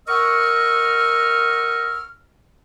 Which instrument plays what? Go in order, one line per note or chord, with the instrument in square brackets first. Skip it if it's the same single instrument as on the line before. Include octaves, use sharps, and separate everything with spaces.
[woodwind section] A#4 D#5 F#5 C#6 E6 F6